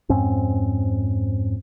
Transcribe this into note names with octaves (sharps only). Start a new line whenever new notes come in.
F2 G#2 C4 C#4